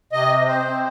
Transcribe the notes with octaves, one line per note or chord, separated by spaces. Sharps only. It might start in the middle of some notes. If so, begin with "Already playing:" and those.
C3 D#5
C4
C5
C4